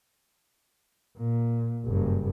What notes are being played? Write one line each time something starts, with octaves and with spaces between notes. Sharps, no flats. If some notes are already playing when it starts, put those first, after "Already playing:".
A#2
F#1 G2